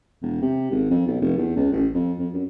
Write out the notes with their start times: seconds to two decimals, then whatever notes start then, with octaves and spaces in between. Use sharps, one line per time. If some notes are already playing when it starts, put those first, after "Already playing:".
0.22 E1
0.42 C3
0.71 G#1
0.90 F2
1.07 B1
1.21 F1
1.38 E2
1.56 C#2
1.72 A1
1.94 F2
2.19 F2
2.33 F#2